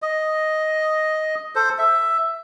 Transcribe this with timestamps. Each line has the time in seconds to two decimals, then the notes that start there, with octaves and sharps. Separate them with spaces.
0.02 D#5
1.55 A4 C5
1.78 E5